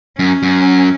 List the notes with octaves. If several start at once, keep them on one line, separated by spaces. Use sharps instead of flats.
F#2 C#4
F#2